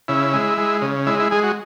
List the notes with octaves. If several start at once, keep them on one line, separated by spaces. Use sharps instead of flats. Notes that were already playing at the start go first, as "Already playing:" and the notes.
C#3 E4
G#3
G#3
C#3
G#3 E4
E4
G#3 G#4
F#4